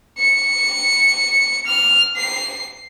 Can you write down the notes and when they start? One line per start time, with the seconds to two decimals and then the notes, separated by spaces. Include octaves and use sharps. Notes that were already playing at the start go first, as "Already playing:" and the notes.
0.18 C#7
1.67 F6
2.16 C7